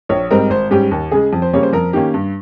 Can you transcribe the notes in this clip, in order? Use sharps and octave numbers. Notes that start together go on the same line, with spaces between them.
A#1 C#5
G#2 G3 C4 D#4 A#4
G#1 C5
G#2 G3 C#4 G4
D#2
C#3 G#3 G#4
F2
C5
C#3 G3 A#3 C#4 C#5
C5
F2 A#4
D#3 A#3 C#4 G4
G2